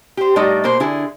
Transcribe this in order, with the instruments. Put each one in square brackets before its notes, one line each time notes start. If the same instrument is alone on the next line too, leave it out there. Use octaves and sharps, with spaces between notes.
[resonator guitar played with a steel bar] G4 C5
A2 G3 A3 D#4 D5 D#5
B2 A#3 C5
D3 E4 G#4